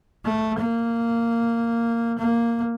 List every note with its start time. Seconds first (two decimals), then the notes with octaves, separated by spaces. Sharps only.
0.25 A3
0.58 A#3
2.19 A#3